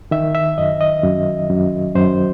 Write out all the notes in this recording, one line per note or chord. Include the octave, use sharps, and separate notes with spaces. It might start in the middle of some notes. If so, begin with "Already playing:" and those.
D#3 E5
E5
F#2 D#5
D#5
F#2
F#2
F#2 C5